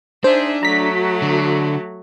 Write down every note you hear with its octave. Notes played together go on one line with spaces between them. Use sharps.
D4 D#4 G#4 C5 E5
F#3 A3 F#4 A#5 B6
D3